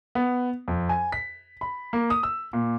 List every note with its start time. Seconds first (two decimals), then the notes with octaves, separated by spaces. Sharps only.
0.15 B3
0.68 F2
0.89 G#5
1.12 B6
1.61 B5
1.93 A#3
2.10 D#6
2.23 E6
2.53 A#2